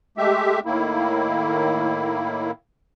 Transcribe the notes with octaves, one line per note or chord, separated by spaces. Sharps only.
G#3 A3 G4 E5
A2 D#3 A#3 E4